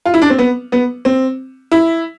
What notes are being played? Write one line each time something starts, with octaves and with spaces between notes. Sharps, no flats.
F4
E4
D4
C4
B3
B3
C4
E4